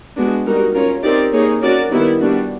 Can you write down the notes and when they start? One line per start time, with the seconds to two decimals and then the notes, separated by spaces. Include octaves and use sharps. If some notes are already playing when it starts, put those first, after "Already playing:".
0.17 G#3 B3 D4 F#4
0.46 G3 A#3 D#4 F#4 A#4
0.75 C#4 F4 A#4 C#5
1.04 C4 D#4 G4 A#4 D5
1.33 A#3 D#4 G#4 C#5
1.61 C#4 F#4 A#4 D5
1.90 D#3 G3 B3 E4
2.20 G3 B3 D4 F#4